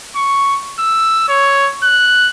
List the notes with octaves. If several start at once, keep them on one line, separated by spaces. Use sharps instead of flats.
C#6
E6
C#5
F#6